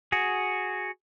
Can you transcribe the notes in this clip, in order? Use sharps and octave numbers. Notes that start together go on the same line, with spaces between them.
F#4 G#4